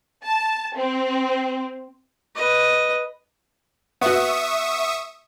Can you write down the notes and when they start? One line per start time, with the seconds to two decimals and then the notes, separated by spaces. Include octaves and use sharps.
0.24 A5
0.76 C4
2.36 B4 D#5
4.01 B3 F#4 E5 C#6 D#6